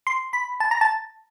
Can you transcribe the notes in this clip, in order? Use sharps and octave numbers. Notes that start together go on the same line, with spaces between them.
C6
B5
A5
A#5
A5